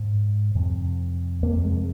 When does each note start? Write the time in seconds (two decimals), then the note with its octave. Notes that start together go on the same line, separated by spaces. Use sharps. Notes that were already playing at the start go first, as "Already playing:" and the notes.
Already playing: G#2
0.55 F2 C3
1.43 F2 C3 A#3
1.65 G#3